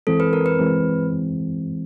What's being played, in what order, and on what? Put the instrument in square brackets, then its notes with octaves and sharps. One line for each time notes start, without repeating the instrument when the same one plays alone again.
[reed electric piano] E3 G#3 C4 [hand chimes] A4
[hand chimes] B4
A#4
B4
[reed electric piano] E3 G#3 C4